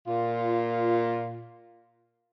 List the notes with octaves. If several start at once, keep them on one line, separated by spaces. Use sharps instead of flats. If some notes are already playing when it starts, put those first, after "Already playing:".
A#2 F4